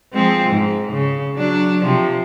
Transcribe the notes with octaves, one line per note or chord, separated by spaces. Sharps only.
F3 G#3 C4
G#2
C#3
F#3 D4
C3 F3